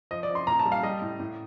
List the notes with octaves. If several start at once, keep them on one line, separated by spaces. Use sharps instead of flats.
F3 D#5
D5
F3
C6
A#2 A#5
A5
G3
F5
G3 D#5
A2
A2